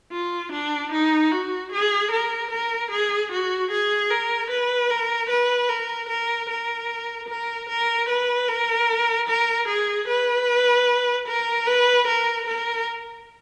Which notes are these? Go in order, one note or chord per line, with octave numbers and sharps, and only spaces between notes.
F4
D4
D#4
F#4
G#4
A#4
A#4
G#4
F#4
G#4
A#4
B4
A#4
B4
A#4
A#4
A#4
A#4
A#4
B4
A#4
A#4
G#4
B4
A#4
B4
A#4
A#4